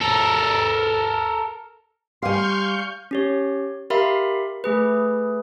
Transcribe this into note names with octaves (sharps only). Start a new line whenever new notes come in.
A4 A#4
G3 G4 F5 G#5 C6 C#6 F6 G6
C#4 G4 C#5
G4 A#4 E5 F5 B5 C6
A3 G#4 B4